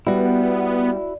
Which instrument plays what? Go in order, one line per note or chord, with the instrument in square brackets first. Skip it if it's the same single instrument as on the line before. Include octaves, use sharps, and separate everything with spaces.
[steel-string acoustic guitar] G3 [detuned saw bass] B3 [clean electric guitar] E4 F#4